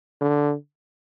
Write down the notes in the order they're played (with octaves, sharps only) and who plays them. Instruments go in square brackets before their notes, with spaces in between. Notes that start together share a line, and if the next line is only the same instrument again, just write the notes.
[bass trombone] D3